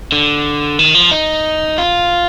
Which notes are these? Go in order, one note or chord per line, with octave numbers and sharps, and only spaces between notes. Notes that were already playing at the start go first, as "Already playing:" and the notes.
D3
D#3
F3
D#4
F4